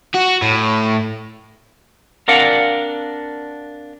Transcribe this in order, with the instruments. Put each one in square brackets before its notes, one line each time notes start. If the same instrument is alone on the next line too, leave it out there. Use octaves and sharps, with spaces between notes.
[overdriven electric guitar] F#4
A2
[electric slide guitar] C4 D4 A#4 D5 F5 F#5